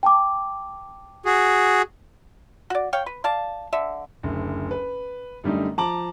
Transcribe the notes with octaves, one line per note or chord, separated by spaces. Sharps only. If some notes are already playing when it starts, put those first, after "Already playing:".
G5 A5 D6
F#4 G#4
F#4 D5
C#5 F5 G5
B4
D5 F5 A5
D3 E5
F#1 D2
B4
F#2 D3 G3 A3 D#4
F3 A5 A#5 D6 F#7